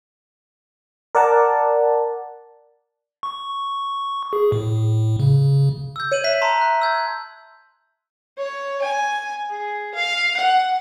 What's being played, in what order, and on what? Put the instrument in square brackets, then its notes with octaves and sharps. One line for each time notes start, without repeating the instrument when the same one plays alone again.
[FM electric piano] A#4 D5 F#5 A5
[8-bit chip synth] C#6
G#4
A2
C#3
[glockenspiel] E6 G6
[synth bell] C#5 [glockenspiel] G6 D#7 F#7
[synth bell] E5 [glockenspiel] F#6 B6
[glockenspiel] A5 A#5 C6
F#6
E6 G6 G#6
[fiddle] C#5
G#5
G#4
F5
F#5